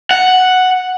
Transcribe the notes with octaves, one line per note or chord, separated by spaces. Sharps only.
F#5